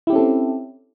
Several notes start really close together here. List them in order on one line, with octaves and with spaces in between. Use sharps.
E4 G4 C#4 A4 C4